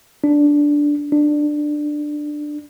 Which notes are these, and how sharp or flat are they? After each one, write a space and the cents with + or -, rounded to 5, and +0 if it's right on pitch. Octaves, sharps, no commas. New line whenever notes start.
D4 -5
D4 +15